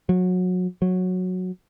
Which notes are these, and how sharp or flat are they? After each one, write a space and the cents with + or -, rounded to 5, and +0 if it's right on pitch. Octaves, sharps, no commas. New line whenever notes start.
F#3 -25
F#3 -10